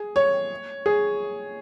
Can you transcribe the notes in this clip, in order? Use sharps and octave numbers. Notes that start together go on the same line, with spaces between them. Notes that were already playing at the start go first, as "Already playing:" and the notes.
Already playing: G#4
C#5
G#4